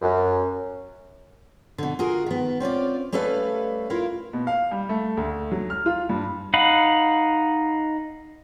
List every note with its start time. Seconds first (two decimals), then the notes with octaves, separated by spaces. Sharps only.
0.02 F#2
1.78 B2 D3
1.99 F4 F#4 G#4 A#4
2.26 D#3 B3
2.60 C4 C#4 F4 D5
3.12 G3 A3 C#4 A4 B4 F5
3.90 E4 F4 A#4 F5
4.33 B2
4.47 F5
4.71 G3
4.89 A3
5.17 D2
5.52 F#3
5.70 F6
5.86 F4
6.09 G2
6.54 D#4 F5 F#5 B5